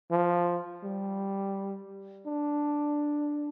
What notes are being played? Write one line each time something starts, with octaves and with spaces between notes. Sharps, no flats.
F3
G3
D4